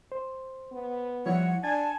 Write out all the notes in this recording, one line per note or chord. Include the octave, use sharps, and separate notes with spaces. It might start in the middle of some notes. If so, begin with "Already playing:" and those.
C5
B3
F3 G3 E4 C#5 F#5
D4 G#5 A5 A6